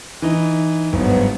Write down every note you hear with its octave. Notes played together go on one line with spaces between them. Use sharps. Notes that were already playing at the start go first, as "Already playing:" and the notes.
E3 D#4
G1 G#2 F#3 B3